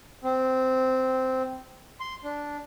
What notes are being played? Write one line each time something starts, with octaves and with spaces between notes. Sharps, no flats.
C4
C6
D4